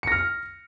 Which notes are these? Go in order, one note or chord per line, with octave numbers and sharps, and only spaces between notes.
F6 A#6 C#7